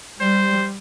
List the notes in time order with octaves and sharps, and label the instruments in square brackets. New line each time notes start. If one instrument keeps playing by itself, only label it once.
[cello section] G3 [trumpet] C5